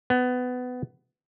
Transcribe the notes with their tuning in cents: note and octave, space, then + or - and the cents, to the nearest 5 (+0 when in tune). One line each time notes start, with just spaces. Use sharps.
B3 +20